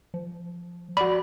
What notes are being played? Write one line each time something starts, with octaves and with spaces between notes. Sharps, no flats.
F3
F#4 D5 B5